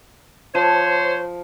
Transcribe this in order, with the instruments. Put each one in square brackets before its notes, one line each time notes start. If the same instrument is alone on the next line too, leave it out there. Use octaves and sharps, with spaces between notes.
[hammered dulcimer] F3 [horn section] C5 C#5